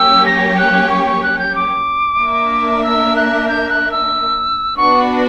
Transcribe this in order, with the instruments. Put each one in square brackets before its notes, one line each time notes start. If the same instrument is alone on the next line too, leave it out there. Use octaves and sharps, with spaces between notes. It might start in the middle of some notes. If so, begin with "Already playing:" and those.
Already playing: [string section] F#3 A#3 C#4 G4 C#5 [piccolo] E6
[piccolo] A#6
F#6
C#6
C#6
F#6
G6
D6
[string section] A#3 D4 A#4 E5
[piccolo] E6
F#6
G6
F#6
E6
[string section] B3 D4 F#4 B4 [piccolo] C#6